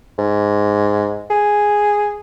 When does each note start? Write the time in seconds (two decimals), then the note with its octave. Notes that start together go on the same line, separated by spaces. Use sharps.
0.18 G#2
1.30 G#4